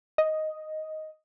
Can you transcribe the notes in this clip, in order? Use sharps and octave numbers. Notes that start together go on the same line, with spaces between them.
D#5